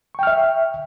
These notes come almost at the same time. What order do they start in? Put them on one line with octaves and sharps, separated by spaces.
C#6 G5 F6 E5